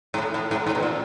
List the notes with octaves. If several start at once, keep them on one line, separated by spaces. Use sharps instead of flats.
G#2
A2 E3 A3 C#4 F4
A2
G#2
G#2
B2
A#2